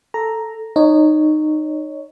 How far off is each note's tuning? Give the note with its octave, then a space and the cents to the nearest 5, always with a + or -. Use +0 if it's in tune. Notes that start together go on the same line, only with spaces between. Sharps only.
A4 +0 A#5 +0
D#4 -20 C#5 +5